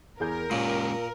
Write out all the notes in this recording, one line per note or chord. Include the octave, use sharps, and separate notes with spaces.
E2 G#4 A#4 G6
A#2 G#3 C#4 G4 C#5